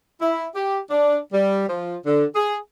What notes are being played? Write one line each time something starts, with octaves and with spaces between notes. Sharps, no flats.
E4
G4
D4
G3
F3
D3
G#4